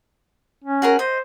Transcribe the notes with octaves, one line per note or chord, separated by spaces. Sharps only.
C#4
F#4 G#4 A#4
C5 D#5